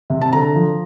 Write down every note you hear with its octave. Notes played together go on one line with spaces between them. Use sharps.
C3
A5
D3 A#5
F3